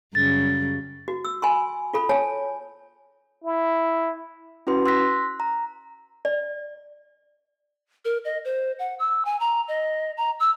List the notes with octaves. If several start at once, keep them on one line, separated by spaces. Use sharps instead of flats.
F#2 C#3 G3 A6
F#4
E6
G#5 B5 C6
F4 A4 B5
C#5 G#5 A5
E4
C#4 E4 F#4 B4 C6
C6 E6 F#6 A#6 B6
A#5
D5
A#4
D#5
C5
F#5
E6
G#5
A#5
D#5
A#5
E6